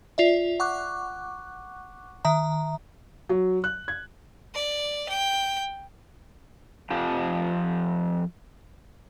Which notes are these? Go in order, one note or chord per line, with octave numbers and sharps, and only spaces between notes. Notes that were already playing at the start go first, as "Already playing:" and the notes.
F4 D5 E5
F#5 C#6 D6 F#6
D#3 E5 A#5
F#3
F#6
G#6
D5
G5
F2 F3 G4